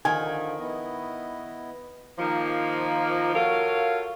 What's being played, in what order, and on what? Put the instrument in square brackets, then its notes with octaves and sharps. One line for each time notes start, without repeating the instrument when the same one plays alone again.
[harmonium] D3 F3 [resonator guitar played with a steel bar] D#3 [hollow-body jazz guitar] G#5
[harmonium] B3 E4 D#5
[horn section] D#3 F3 A#3
F4 F#4 A4 A#4 C#5 F5